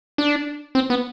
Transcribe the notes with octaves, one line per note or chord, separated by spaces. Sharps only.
D4
C4
B3